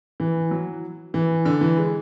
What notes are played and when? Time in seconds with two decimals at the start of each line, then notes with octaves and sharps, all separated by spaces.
0.20 E3
0.51 F#3
1.14 E3
1.45 D3
1.61 E3
1.77 G#3